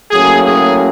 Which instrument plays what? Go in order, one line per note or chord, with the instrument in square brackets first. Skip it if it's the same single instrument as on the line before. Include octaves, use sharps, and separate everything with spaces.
[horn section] A2 F#3 A#3 C#4 G#4
G#4